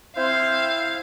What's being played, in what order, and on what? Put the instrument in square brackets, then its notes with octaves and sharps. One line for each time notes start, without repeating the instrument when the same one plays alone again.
[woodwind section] C4 C5 [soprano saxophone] E4 [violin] F5